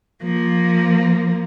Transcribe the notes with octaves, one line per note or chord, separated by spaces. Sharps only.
F3 A#3